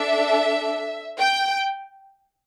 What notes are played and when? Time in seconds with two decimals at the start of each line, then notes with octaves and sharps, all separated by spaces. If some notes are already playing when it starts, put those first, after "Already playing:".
Already playing: D4 A4 E5
1.18 G5